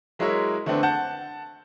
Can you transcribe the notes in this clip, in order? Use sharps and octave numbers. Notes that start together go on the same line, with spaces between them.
F#3 G#3 E4 A#4 C#5 E5
D3 A3 B3 C4 D4
F#5 A5 G6